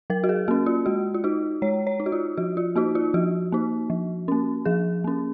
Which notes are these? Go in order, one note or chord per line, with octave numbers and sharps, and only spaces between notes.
F#3 A#4
F#4
G#4
A#3 C#4 F#4
F4
G#3 F#4
F4
D#4 F#4
G#3 C#5
C#5
D#4
F#4
F4
F3 F#4
F4
A#3 D#4 F#4
F4
F3 F#4
A#3 D#4
F3
A#3 C#4
F3 G#4
A#3 C#4